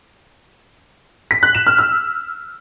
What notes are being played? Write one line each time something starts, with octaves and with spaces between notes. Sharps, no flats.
B6
F#6
E7
F6
E6